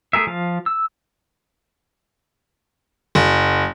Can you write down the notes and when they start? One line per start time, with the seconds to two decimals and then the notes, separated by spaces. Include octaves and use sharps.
0.13 A3 G#4 A#4 E5
0.27 F3 F5
0.66 E6
3.15 F#1